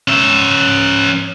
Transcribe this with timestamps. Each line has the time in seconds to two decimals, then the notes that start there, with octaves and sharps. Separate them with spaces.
0.08 C#4 E5